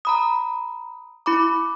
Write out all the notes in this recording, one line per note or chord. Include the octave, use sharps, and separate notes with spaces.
A#5 B5 D#6
E4 B5 D6